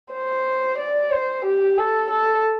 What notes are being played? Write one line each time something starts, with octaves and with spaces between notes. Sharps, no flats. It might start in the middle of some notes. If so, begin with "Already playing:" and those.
C5
D5
C5
G4
A4
A4